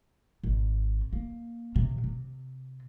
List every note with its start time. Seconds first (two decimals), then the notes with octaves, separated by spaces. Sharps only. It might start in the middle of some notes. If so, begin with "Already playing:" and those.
0.44 G#1
1.13 A#3
1.76 C3
2.04 C3